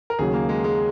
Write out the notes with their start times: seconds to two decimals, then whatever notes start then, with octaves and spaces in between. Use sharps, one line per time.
0.10 A#4
0.19 D#2 C#3 F#3 G#4
0.34 A#3
0.49 G#3
0.64 G#3